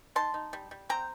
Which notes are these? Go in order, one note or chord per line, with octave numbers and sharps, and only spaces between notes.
D#4 A5 C6
D#4
G3
G3
C4 G5 A#5